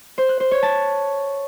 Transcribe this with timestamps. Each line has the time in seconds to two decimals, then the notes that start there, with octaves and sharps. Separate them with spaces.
0.18 C5
0.29 F#6
0.40 C5
0.51 C#5
0.63 A5